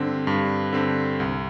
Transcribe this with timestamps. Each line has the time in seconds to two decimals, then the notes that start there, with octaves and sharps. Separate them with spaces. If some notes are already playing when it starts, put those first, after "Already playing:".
Already playing: G2 D3 C4
0.27 G2
0.73 D3 C4
1.20 C2